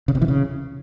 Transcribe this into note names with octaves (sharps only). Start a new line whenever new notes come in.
C#3
C3
E3
C#3